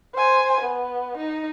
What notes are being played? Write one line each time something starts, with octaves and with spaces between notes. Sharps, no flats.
C5 G#5
B3
D#4